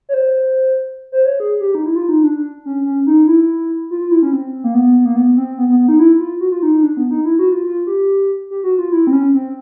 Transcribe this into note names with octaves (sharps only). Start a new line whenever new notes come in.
C#5
C5
C5
C#5
G#4
G4
D#4
E4
F4
D#4
D4
C#4
C#4
D#4
E4
F4
F4
E4
C#4
C4
A#3
B3
A#3
B3
C4
B3
B3
B3
D#4
E4
F4
F#4
F4
D#4
D#4
D4
B3
D#4
E4
F#4
F4
F4
G4
G4
F#4
F4
E4
C4
C#4
C4